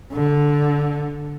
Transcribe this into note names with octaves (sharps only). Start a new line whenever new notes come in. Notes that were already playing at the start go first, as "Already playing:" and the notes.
D3